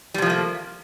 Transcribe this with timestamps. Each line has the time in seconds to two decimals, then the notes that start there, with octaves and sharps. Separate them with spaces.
0.14 G3
0.18 C3
0.22 F3
0.26 A3
0.30 A#3